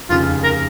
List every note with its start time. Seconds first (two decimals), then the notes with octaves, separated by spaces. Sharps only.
0.09 F1 D#2 C#3 F4
0.44 A#4